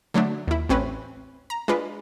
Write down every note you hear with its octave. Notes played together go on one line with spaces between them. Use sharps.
D3 F#3 A3 D4
D#2 E4
A1 C4 C#4 B4
A#5
G#3 D4 F4 B4